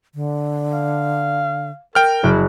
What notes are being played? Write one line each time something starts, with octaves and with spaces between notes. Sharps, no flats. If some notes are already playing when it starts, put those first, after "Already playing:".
D3
F5
A#4 G5 F6
F#1 E4 F#6